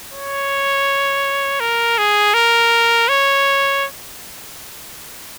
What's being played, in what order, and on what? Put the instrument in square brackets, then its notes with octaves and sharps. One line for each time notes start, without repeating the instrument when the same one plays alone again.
[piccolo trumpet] C#5
A#4
G#4
A#4
C#5